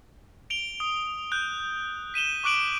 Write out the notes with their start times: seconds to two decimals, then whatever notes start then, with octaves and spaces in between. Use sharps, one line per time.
0.50 D7 F7 G7
0.80 D#6
1.32 F#6 G6
2.14 B6 D#7 E7 G7
2.44 C#6 D6 F#6 D7 F#7